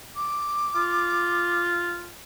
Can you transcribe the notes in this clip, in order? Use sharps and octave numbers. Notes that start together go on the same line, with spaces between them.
D6
F4